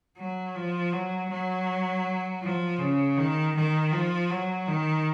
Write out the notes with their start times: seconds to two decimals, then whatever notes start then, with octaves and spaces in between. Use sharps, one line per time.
0.17 F#3
0.55 F3
0.93 F#3
1.31 F#3
2.43 F3
2.79 C#3
3.17 D#3
3.55 D#3
3.92 F3
4.30 F#3
4.68 D#3